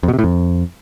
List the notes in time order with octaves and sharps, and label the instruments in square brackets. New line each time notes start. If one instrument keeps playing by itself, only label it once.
[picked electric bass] F2
B2
C3
A2
F2